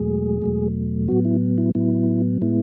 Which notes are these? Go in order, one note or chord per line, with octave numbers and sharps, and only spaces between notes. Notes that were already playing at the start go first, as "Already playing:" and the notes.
Already playing: E2 B2 F#3 G#3 A3 G#4
E2 B2 F#3 A3
A2 F#3 B3 F#4
E4
E4
A2 F#3 B3 E4
A2 G#3 B3 E4